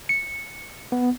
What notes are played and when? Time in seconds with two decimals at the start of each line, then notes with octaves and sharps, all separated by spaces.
0.09 C#7
0.92 B3